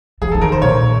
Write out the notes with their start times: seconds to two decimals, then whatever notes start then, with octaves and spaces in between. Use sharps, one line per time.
0.22 E3 G#4
0.32 A4
0.34 E3
0.41 D#3 A#4
0.52 C5
0.62 A#2 C#5